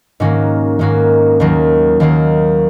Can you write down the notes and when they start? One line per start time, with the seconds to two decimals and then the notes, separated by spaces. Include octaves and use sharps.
0.20 G#2 D#3 A#3 C#4 F#4
0.79 G#2 D#3 A#3 C#4 F#4
1.40 D#2 D#3 F#3 A#3
2.00 D#2 D#3 F#3 A#3